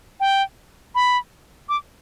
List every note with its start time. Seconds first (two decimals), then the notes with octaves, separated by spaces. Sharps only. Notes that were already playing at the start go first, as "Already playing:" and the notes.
0.20 G5
0.95 B5
1.69 D6